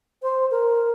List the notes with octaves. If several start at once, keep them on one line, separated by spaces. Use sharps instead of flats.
C5
A#4